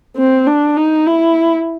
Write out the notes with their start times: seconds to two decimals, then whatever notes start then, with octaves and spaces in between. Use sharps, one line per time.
0.17 C4
0.47 D4
0.76 D#4
1.06 E4